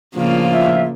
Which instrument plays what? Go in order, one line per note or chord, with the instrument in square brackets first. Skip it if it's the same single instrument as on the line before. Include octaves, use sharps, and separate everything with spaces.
[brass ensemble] A2 D4 F4 [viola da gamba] C#3 A#3 [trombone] F3
[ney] E5